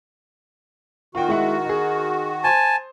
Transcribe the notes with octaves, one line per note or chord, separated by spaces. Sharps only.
D#3 F4 F#4 G5
G#3 E4 F#5
D#4 G#4
C5 G#5 A5